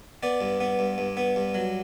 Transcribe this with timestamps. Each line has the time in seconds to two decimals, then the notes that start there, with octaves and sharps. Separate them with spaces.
0.23 B3 D5
0.41 G2
0.60 B3
0.79 G2
0.98 G2
1.17 B3
1.36 G2
1.54 F#3